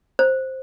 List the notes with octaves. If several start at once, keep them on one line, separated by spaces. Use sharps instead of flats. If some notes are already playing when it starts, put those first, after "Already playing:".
C5